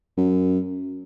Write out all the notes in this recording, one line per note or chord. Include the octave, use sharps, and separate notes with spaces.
F#2